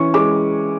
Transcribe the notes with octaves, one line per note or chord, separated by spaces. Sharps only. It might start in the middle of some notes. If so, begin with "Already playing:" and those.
Already playing: E3 C#4 C#6
G#3 D6